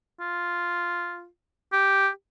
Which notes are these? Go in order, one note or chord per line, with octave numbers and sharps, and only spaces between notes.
F4
G4